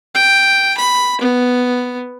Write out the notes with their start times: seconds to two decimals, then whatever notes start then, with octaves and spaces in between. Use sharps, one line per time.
0.15 G5
0.77 B5
1.21 B3